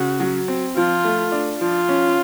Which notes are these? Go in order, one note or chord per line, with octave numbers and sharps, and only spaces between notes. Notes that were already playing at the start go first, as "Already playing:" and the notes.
Already playing: C#3 F#4
F#3
C4
F3 F4
A3
D4
F3 F4
C#4